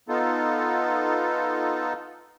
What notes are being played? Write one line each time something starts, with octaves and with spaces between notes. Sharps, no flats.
B3 D#4 F4 A4